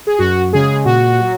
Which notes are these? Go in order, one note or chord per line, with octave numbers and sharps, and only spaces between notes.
G#4
F#2 F#4
C#3 G#3 G#4
A#2 F#4
F#3